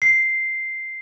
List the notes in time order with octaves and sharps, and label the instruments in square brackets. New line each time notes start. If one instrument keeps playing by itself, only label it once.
[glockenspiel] C7